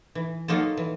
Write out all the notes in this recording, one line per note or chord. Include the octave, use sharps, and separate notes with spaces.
E3
F#3 A#3 D#4 F4 A4
E3